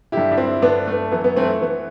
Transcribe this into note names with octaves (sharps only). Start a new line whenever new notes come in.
G2 D3 E4 G4
D4
C4 E4
G2 D3 B3 D4
A3
F#2 E3 B3
B3
A3 C4
A3
E3 B3